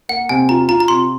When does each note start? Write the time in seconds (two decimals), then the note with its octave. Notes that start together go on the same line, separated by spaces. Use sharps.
0.09 A#3 F#5
0.29 C3 G#5
0.49 F4 A#5
0.68 F4 A#5
0.80 A#5
0.88 C3 C6